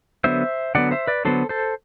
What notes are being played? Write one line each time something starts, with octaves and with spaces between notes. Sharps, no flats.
D3 F#3 B3 C5 E5
D3 F#3 B3 D5 F#5
C5 E5
B4 D5
D3 F#3 B3 A4 C5
A4 C5